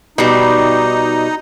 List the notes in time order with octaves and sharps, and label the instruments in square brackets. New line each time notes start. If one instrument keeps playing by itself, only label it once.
[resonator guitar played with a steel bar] B2 G3 [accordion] D#4